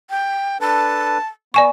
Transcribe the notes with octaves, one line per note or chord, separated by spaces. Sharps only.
G5
D4 A4 B4 A5
B3 D5 G#5 C#6